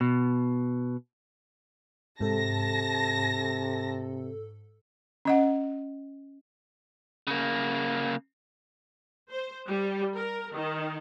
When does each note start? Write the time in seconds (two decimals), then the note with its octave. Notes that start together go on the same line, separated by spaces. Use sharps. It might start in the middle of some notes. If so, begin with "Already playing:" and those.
0.01 B2
2.21 G#2 C3 A4 A5 A#6
5.25 C#4 D#5 F#5
7.27 C#3 A#3
9.31 C5
9.67 G3
10.16 A#4
10.54 D#3